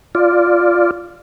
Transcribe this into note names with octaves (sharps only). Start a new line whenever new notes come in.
F4 D5